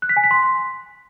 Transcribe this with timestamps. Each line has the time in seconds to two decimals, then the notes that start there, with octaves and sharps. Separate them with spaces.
0.02 F#6
0.09 B6
0.17 G#5
0.24 B6
0.31 C6